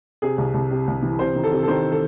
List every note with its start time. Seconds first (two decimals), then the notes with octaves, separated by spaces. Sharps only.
0.22 C3 G#4
0.38 C2
0.54 C2
0.71 C3
0.87 C2
1.02 E3
1.19 C3 C5
1.35 D#3
1.43 A4
1.52 C3
1.63 A4
1.68 D#3 C5
1.92 A4